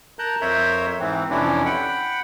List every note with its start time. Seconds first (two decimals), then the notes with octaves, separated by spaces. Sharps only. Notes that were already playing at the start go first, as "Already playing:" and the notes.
0.19 A#4 A5 A#5 F#6 G6
0.41 F2 A#4 C5 C#5 E5 G6
1.00 G#2 E3 C4
1.30 F2 C3 E3 C#4 D4 E4
1.66 F#5 G5 B5